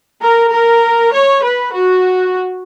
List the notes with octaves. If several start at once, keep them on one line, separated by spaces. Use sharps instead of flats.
A#4
A#4
C#5
B4
F#4